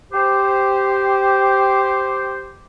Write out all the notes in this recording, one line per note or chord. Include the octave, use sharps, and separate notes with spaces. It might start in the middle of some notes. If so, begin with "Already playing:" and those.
G4 C5